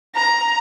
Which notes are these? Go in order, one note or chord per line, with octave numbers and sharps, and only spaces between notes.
A#5